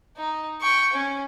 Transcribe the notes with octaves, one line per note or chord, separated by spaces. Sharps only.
D#4
G5 C#6
C#4